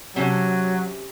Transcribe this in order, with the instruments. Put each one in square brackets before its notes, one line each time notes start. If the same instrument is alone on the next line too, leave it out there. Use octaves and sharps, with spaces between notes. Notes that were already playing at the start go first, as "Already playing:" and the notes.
[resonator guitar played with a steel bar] C3 C#4 [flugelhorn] F#3